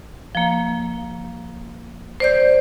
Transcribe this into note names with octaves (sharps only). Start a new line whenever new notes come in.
F3 A#3
C5 D5 G6